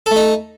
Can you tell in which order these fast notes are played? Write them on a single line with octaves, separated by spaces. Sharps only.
A4 A3 D#4